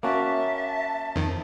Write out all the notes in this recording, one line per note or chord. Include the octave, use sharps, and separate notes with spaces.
A#3 C#4 F#4 E5 A5
F2 D#3